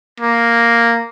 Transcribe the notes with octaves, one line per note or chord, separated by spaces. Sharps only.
A#3